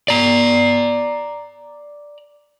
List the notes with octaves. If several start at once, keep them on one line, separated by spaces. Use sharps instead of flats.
D5 A#5